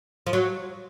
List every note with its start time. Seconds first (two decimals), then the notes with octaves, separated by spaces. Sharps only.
0.27 F3
0.33 F#3